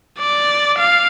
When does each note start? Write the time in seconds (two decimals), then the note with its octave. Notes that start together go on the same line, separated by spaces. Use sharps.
0.19 D5
0.79 F5